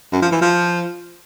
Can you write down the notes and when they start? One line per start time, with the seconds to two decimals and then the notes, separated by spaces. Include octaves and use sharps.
0.12 F#2
0.22 F3
0.32 E3
0.41 F3